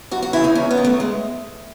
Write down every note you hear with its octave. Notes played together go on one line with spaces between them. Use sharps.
F#2 F#4
F#4
C#3 E3 E4
D#4
E2 C#4
B3
D#3
A3
G#3